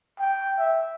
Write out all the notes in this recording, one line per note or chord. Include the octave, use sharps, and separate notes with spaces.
G5
E5